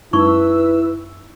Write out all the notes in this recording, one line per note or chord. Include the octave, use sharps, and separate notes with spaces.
F#2 G#3 C#4 D#4 E4 B4 C#6 E6